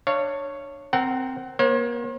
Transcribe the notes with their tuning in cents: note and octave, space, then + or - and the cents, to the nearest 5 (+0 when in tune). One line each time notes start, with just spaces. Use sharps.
D4 +25 C#5 +0 F5 -25
C4 +0 A#4 +0 F#5 +25
A#3 +35 C5 +45